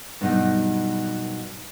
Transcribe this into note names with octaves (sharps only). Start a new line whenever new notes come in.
G2 B2 F#3 G3 B3 D#4